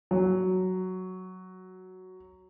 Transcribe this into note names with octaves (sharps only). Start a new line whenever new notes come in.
F#3